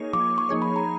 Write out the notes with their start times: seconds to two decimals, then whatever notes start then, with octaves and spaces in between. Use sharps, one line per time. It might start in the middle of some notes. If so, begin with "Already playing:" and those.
Already playing: A#3 D#4 G#4 C#5
0.13 F3 D6
0.38 C#6
0.49 A#3 D#4 G#4 C#5
0.62 B5
0.76 A#5